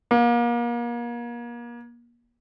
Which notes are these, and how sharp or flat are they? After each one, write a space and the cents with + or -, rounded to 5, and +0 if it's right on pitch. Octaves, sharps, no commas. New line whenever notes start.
A#3 +35